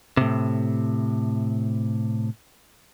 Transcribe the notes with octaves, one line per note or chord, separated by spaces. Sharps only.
A2 C3